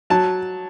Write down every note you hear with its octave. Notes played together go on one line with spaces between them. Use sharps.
F#3 A5